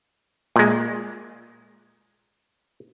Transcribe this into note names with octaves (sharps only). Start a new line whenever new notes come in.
A#2 G#3